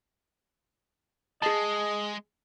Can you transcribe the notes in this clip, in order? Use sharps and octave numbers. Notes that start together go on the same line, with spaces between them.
G#3 G#4 D#5 A5